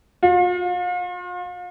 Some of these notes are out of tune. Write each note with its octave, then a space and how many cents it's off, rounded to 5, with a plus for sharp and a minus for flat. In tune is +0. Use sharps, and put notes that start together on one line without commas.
F4 +40